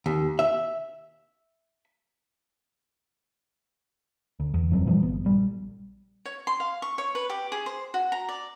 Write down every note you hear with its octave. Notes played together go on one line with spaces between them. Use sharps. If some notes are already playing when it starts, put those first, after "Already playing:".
D#2
E5
D2
E2
F#1 F3 F#3 C4
A#2 E3 F3 G3
G1 B3
A#1 G3
C#5
C6
F5
C#6
C#5
B4
G4
G#4
C5
F#4
A#5
D5